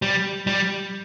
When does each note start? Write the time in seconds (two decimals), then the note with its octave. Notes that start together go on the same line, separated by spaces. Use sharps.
0.02 G3
0.47 G3